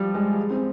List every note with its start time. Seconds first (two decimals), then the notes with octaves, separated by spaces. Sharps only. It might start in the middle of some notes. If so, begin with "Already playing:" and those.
Already playing: F3 G3
0.14 G#3
0.50 C4